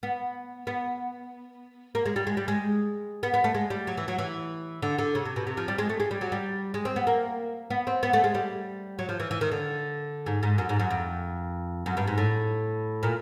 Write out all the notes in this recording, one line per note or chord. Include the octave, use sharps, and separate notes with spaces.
B3
B3
A#3
G#3
G3
G#3
G3
G#3
B3
B3
A3
G#3
G3
F#3
E3
F#3
E3
D3
D3
C#3
C3
B2
C3
F3
G3
G#3
A3
G#3
G3
F#3
G3
G#3
C4
B3
A#3
B3
C4
B3
A3
G#3
G3
F#3
F3
E3
E3
D#3
D3
G#2
G#2
F#2
G#2
F#2
F2
F#2
G2
G#2
A2
A#2